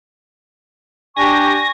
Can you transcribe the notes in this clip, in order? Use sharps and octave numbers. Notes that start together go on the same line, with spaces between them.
D4 G4 G#5 C#6 A#6